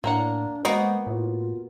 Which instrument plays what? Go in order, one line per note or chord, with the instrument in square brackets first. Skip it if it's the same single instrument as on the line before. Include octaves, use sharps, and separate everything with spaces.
[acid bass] A2 [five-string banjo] A#3 A#4 F#5 [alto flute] D4
[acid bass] G#3 [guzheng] A#3 B3 F#4 [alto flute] C5 [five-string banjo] D#5
[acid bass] A2 [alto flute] F4